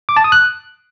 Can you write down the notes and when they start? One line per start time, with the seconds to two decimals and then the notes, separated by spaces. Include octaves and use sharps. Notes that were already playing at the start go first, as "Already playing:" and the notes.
0.09 D6
0.17 A5
0.24 D#6
0.32 F#6